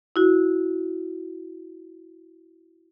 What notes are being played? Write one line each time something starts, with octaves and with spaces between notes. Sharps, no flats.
E4 F#4